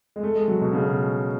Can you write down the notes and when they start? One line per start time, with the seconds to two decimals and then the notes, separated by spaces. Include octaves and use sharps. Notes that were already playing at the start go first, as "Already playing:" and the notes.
0.16 G#3
0.23 A3
0.35 G#3
0.48 F#3
0.61 B2
0.73 C#3
0.86 B2